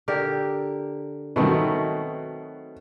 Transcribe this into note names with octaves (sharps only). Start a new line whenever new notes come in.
D3 G4 A#4
B2 D#3 F#3 A3 C4